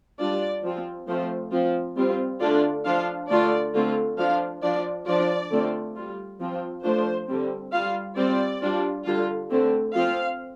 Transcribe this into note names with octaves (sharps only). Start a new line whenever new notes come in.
G3 D4 F4 D5
F3 C4 F4
F3 A3 C4 F4 C5
F3 C4 F4
G3 C4 F4
D3 A3 D4 F4 D5
F3 D4 F4 F5
D3 A3 D4 F4 D5
D3 A3 C4 F4
F3 D4 F4 F5
F3 D4 F4 D5
F3 D4 F4 D5
D3 A3 C4 F4
G3 F4
F3 C4 F4
F3 A3 D4 F4 C5
D3 G3 C4
G3 F4 F5
G3 C4 F4 D5
G3 D4 F4
D3 G3 F4
D3 A3 C4
F3 C4 F4 F5